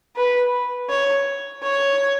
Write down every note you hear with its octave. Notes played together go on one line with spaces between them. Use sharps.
B4
C#5
C#5